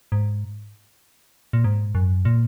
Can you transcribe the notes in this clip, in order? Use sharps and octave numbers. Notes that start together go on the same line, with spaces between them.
G#2
A#2
G#2
F#2
A#2